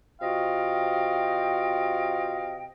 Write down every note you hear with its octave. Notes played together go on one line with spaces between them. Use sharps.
C3 F4 F#4 D#5 F5 G5